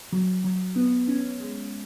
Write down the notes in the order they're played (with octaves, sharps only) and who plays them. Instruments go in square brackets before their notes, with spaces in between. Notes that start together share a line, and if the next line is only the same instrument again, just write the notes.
[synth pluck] F#3
F#3
B3
C#4
G#3